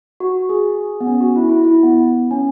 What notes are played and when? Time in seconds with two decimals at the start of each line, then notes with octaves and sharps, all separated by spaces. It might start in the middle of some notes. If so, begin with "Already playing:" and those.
0.20 F#4
0.49 G#4
1.00 B3
1.07 C#4
1.21 F#4
1.36 E4
1.49 E4
1.64 E4
1.83 B3
2.31 C#4